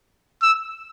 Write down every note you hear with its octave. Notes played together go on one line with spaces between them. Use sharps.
E6